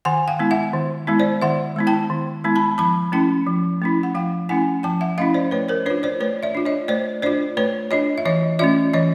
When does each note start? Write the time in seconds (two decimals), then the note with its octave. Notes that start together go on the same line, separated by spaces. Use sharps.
0.05 D#3 F#5 G#5
0.28 F5 G5
0.39 G#3 B3 E4
0.51 E5 F#5
0.74 D#3
1.07 G#3 B3 E4
1.19 C5 D5
1.42 D#3 E5 F#5
1.76 G#3 B3 E4
1.87 G5 A5
2.10 D#3
2.44 G#3 B3 E4
2.55 A5 B5
2.78 F3 A5 B5
3.12 A3 C#4 E4 G5 A5
3.47 F3
3.82 A3 C#4 E4
4.03 F#5
4.15 F3 F5 G5
4.49 A3 C#4 E4 F#5 G#5
4.83 F3 G5 A5
5.01 E5 F#5
5.18 A3 C#4 E4 D#5 F5
5.34 C5 D5
5.51 A3 B4 C#5
5.69 A#4 C5
5.86 D4 F4 B4 C#5
6.03 C5 D5
6.20 A3 B4 C#5
6.43 D5 E5
6.55 D4 F4
6.65 C#5 D#5
6.88 A3 C5 D5
7.22 D4 F4 C5 D5
7.57 A3 B4 C#5
7.91 D4 F4 C#5 D#5
8.18 E5
8.25 E3 C#5 D#5
8.59 A3 C#4 F4 D5 E5
8.93 E3 C#5 D#5